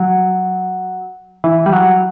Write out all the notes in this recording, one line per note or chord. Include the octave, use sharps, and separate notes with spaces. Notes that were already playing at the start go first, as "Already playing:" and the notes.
Already playing: F#3
E3
G3
F#3